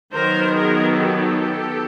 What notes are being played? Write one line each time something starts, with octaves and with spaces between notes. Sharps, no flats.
D#3 F#3 B3 A#4 C5
G#4 A#4
G4 A4